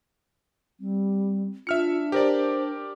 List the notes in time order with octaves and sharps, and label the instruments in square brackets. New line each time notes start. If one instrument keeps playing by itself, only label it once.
[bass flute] G3 [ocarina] C4
[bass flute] D4 [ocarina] F4 [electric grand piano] E5 F6 C#7
[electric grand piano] G4 A#4 D5 [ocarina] C5